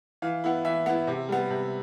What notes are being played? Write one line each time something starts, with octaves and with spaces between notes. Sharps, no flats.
E3 F5
B3 E4
E3 E5
B3 E4
C3
G3 B3
C3